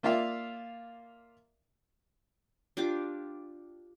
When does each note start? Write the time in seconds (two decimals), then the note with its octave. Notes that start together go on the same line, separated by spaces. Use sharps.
0.03 A#3 F4 D5 E5 F5
2.77 D4 F4 G4 D6